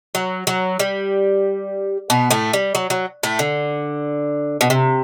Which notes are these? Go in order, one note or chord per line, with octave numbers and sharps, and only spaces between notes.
F#3
F#3
G3
B2 B3
A2 A3
G3
F#3
F#3
A2 A3
D3
B2
C3